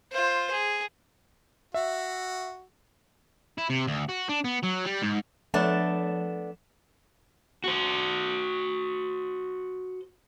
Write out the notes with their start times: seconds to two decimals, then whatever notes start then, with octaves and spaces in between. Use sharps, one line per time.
0.12 F4 C5
0.51 G#4
1.74 F#4 E5
3.58 E4
3.70 C3
3.87 D2
4.09 F#4
4.29 D4
4.44 B3
4.64 F#3
4.86 G3
5.03 G#2
5.54 F3 A3 B3 D4 E7
7.64 F#4 C5